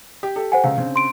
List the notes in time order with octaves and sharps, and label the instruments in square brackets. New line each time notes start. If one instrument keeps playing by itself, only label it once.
[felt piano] G4
G4 A4
[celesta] C5 F#5 G#5
[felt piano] C#2 C#3 [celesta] F5
[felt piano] C#3 C4 D4
[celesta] C6 D7